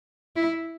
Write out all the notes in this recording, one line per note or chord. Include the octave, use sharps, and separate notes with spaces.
E4